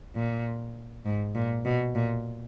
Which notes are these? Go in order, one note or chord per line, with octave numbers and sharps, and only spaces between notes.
A#2
G#2
A#2
B2
A#2